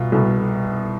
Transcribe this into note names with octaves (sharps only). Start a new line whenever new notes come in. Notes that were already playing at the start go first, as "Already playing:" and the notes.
Already playing: C2 B2 F4
C2 B2